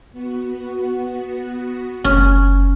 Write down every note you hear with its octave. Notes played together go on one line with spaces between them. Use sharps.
B3 F#4
F#1 C#4